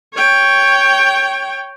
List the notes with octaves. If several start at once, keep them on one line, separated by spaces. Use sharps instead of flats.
C#5 G5